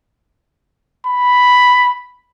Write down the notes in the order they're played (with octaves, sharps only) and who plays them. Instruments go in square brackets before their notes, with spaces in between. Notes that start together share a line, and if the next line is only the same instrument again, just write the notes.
[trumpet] B5